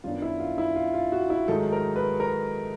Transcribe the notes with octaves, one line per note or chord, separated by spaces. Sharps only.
F#2 D#3 G3 B3 D4 F4
E4
F4
E4
F4
F4
F#4
E4
G#2 D#3 F#3 A3 A4
A#4
B4
A#4